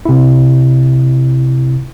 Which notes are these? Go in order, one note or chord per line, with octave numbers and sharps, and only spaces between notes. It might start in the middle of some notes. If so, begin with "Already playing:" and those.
C3 E4